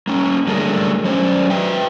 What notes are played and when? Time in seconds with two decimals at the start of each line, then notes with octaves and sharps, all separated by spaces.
0.07 A#3 C#4
0.47 F#3 G3 A3 D4 G#4 A#4
1.04 F#3 C#4 C5 D5
1.50 B4 E5 G5